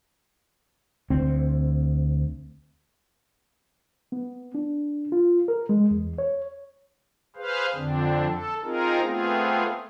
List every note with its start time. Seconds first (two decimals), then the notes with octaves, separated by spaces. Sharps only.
1.10 D2 C4
4.12 B3
4.55 D4
5.12 F4
5.48 A#4
5.69 G#3
5.91 E2
6.18 C#5
7.36 G#4 B4 C5 F5
7.75 F2 D3 C4 D4
8.29 A4
8.63 C4 D#4 F4 G#4 A#4
9.02 A3 B3 C4 F4 G#4